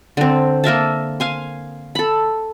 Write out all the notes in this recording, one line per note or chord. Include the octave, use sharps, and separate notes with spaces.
D3 C4
A#3 A#4 E5 A5
F5 G#5 C6
A4 B5